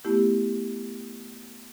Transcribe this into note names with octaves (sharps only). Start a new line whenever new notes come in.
A3 B3 E4 G4